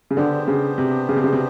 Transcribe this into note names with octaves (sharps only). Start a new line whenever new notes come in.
C#3
D3 B3 D4 G4 C5
C#3
C3
C#3
C3
C#3
C3